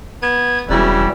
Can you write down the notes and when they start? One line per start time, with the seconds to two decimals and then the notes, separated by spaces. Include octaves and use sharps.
0.22 B3 G#6
0.70 E1 C#3 E3 G3 E4 F#4